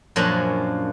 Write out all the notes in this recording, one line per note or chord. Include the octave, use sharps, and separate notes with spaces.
F#2 A#2 F3 A#3 C#4 D4